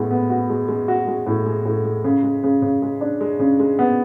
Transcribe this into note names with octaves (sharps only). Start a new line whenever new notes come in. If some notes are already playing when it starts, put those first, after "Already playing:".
Already playing: A2 G#3 B3
B3
F#4
G#3
G#3
F#4
G#3
A2
G#3
A2
G#3
C#3
G#3
C#3
C#3
G#3
D4
G#3
C#3
G#3
B3